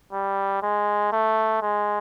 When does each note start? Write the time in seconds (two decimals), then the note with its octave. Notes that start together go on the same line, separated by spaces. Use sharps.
0.13 G3
0.62 G#3
1.12 A3
1.62 G#3